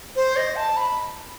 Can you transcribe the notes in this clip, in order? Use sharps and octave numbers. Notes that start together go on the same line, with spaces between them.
C5
D#5
A5
B5